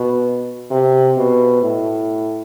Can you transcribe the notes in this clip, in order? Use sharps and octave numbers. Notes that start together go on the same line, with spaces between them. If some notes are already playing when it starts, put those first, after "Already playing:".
Already playing: B2
C3
B2
A2